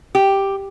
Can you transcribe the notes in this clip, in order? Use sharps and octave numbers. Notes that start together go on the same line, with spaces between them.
G4